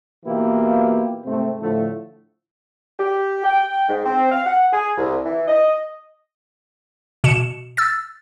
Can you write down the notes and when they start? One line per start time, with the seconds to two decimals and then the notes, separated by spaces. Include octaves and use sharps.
0.25 B2 E3 A#3 E4 F4 G4
1.26 G#2 C3 A3 C4
1.61 A2 D3 F3 A3
2.99 G4
3.44 G5
3.89 G#2
4.06 C4
4.32 F5
4.46 F#5
4.72 G#4
4.97 C2
5.26 E3
5.48 D#5
7.24 B2 C#7 E7
7.77 E6 A6